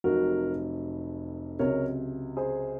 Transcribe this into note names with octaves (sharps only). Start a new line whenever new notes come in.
F1 F2 C3 F#3 F#4 A#4
C#2 C3 F#3 A#4 C#5
G#4 C5